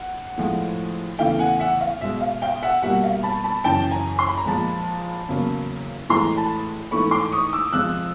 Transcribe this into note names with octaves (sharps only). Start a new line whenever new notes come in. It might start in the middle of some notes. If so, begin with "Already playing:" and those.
Already playing: F#5
A2 F3 G#3
E2 C#3 E3 A3 F5 G5
F#5 G#5
E5 F#5
F5
B2 G#3 E5
F5
F5 G5
E5 F#5
B2 G3 A#3 E5 F#5
F5
A5 B5
A5 B5
F#2 C#3 E3 G5 A5
G#5 A#5
C6
B5
A#5
A#2 F3 G#3 A5 B5
E2 C#3 F#3 A#3
A2 E3 G#3 A#5 C6
A5 B5
G#2 E3 A3 B5 C#6
C6 D6
C#6 D#6
D6 E6
F2 C3 F3 G#3 E6 F#6